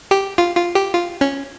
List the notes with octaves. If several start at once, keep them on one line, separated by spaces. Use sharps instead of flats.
G4
F4
F4
G4
F4
C#4